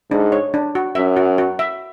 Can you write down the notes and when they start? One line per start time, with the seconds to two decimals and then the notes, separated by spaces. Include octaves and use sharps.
0.11 G#2 D4
0.32 C#5
0.54 D4
0.75 F#4
0.95 F#2 E5
1.17 F#4
1.38 F#4
1.59 E5